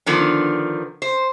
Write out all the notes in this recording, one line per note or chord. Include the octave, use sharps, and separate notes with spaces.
D3 D#3 F3 B3
C5